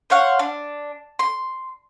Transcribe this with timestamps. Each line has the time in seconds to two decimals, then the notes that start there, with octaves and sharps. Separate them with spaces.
0.10 C5 C#5 F5 F#5
0.39 D4
1.19 C6